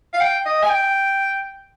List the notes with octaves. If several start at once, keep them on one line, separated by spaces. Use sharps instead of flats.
F5
G5
D#5
G#5
G5